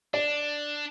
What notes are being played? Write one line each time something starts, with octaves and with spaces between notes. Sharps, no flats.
D4 D5